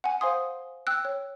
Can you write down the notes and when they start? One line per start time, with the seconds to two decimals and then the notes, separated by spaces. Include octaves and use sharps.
0.04 F#5 G#5
0.21 C5 F5 G#5 C6 D#6
0.87 G5 E6 F#6
1.05 C#5